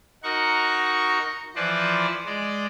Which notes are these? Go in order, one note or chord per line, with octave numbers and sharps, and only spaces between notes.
D#4 F#4 A#4 F#5 C#6
E3 F3 B4 C5 D5
G#3 D5